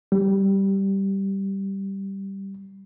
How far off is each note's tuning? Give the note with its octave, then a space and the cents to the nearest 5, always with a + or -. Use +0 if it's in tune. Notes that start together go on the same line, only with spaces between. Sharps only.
G3 -5